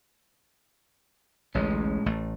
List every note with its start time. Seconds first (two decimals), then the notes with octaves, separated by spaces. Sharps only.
1.55 A1 D2 A2 G#3 C#4
2.06 A1 A3